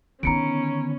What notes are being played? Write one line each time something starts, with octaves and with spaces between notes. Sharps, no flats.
D3 D#3 B3 C#4 A#5 C#7 D7